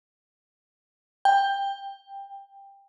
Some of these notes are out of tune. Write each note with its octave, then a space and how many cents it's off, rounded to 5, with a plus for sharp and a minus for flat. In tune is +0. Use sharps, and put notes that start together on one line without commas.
G5 +15